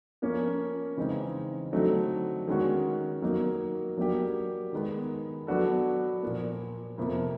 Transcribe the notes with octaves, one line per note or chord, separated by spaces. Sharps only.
F3 A#3 C#4
C#3 E3 G#3 C4 D#4
D3 F#3 A3 C4 D#4
D#3 G#3 C#4 F#4
F#3 A#3 D#4
F#3 A#3 D4 G4
D#3 G#3 B3
F#3 B3 D4 F#4 A4
A#2 F3 A#3
F2 C3 F3 A#3